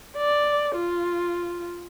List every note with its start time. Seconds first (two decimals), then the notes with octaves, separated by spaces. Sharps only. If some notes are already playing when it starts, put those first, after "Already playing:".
0.17 D5
0.75 F4